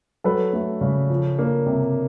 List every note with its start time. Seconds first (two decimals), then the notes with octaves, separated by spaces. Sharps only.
0.24 F#3 A4 B4
0.53 A3
0.81 C#3
1.10 F3
1.39 A#3
1.66 C3